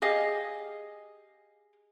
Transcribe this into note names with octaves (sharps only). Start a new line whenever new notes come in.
G4 G#4 D#5 F5